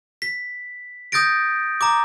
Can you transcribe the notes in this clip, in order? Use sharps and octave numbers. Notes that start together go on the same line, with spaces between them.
B6
D#6 G6 A6 A#6 D7
A#5 D6